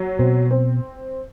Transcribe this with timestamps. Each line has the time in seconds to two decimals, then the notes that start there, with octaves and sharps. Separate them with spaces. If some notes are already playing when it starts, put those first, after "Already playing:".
Already playing: F#3
0.19 B2 C4
0.51 C4